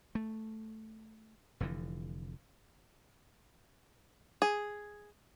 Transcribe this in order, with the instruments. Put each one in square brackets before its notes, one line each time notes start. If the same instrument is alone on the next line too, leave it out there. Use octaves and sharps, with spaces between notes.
[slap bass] A3
F1 F2 D3 E3
[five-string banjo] G#4